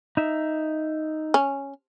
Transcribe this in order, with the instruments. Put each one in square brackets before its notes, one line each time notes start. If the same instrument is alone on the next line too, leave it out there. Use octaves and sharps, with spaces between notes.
[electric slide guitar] D#4 E5
[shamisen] C#4